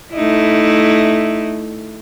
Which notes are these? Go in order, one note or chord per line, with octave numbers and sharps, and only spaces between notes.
A3 D#4 E4